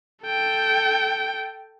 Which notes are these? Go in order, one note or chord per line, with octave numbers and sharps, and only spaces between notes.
A4 G5